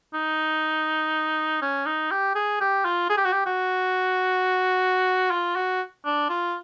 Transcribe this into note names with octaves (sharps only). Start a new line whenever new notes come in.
D#4
C#4
D#4
G4
G#4
G4
F4
G#4
G4
F#4
G4
F#4
F4
F#4
D4
F4